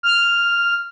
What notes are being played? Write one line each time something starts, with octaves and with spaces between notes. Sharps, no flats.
F6